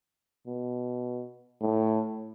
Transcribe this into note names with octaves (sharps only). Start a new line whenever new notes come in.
B2
A2